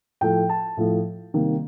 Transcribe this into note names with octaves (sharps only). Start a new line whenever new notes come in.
A2 F3 A3 G5
A5
A2 F3 A3
C3 D#3 G3 A#3